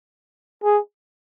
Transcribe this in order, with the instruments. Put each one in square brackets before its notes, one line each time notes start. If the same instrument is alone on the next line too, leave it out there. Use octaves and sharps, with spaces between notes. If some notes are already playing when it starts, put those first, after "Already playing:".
[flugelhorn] G#4